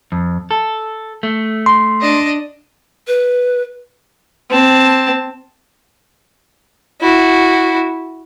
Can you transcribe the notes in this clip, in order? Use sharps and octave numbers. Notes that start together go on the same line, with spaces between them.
F2
A4
A3
C6
D4 D#5
B4
C4 A5
E4 F#4